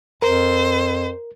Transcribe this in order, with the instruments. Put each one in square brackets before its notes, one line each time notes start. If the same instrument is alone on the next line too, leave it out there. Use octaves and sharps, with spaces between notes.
[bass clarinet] F2 [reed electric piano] A#4 [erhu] C5